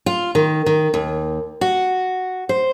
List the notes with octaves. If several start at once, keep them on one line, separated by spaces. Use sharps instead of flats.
F4
D#3
D#3
D#2
F#4
C5